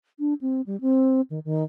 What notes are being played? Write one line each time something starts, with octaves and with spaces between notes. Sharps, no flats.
D4
C4
G3
C4
D#3
D#3